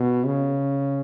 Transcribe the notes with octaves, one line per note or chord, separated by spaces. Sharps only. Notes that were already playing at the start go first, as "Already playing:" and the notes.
Already playing: B2
C#3